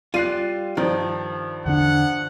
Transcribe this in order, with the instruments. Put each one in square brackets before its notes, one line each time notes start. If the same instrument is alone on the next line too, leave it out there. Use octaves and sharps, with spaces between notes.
[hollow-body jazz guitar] G3 F4 [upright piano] F#6 C7 D#7
[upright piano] G2 F3 [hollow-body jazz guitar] D#3
[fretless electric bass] E2 D3 D4 [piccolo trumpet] F#5